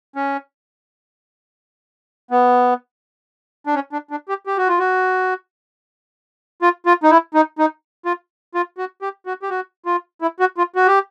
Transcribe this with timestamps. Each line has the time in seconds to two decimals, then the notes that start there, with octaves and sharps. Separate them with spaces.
0.16 C#4
2.31 B3
3.67 D4
3.74 C#4
3.92 D4
4.11 D4
4.29 G4
4.46 G4
4.57 F#4
4.68 F4
4.79 F#4
6.62 F4
6.86 F4
7.03 D#4
7.10 E4
7.34 D#4
7.58 D#4
8.05 F4
8.54 F4
8.78 F#4
9.02 G4
9.26 F#4
9.42 G4
9.50 F#4
9.86 F4
10.22 E4
10.40 F#4
10.58 F4
10.76 F#4
10.87 G4